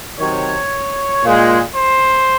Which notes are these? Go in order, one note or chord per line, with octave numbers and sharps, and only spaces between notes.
C3 D#3 F#3 C#5
A#2 G#3
C5